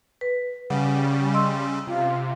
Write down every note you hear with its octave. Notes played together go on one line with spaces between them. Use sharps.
B4
C#3 G3 C#4 F#5
D#5 C6 E6
C3 F4